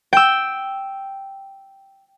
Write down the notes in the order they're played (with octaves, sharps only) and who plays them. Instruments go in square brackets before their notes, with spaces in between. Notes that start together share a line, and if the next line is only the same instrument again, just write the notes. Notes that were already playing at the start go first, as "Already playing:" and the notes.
[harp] G5 E6